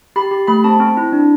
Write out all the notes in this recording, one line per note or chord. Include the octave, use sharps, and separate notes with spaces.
G4 B5
G4
A3 B5
C4 A5
C4
E4
D4